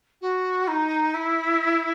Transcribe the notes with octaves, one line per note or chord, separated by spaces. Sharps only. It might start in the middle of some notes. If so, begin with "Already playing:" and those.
F#4
D#4
E4